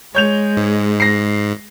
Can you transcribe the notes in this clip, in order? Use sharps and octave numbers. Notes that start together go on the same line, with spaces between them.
G#3 C#5 G6 F7
G#2
A#6 C7